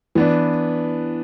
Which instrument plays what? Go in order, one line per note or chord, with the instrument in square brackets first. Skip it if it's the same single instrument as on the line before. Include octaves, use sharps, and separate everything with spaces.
[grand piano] E3 B3 D4